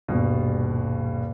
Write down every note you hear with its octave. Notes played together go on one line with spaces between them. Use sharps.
D#1 G2 B2